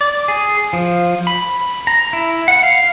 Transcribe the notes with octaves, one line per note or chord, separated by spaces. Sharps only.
D5
G#4
F3
B5
A#5
E4
F#5
F5